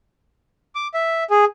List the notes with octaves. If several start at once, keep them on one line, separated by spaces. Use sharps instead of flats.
D6
E5
G#4